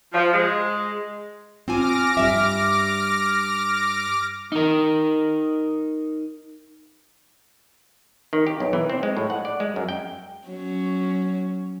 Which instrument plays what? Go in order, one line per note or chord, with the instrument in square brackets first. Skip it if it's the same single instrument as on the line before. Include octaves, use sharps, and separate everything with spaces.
[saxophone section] F3
G#3
[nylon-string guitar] C4 F4 G#5 [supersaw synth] D6 F6 A#6
[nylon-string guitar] G2 G3 E5
[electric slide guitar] D#4 A#4
[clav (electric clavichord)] D#3
G4
B1
E3
C4
G#3
A2
F#5
D5
G#3
F#2
G5
[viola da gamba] F#3 C#4